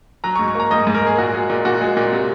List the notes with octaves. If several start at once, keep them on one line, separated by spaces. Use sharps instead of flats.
F#3 A#5
C#6
G#2
C#6
A#3 A#5
G#2 D#5
G#2
A#4
A#3 G#4
A#2 F#4
G#3
A#2
A#2 F#4
G#3
A#2
C3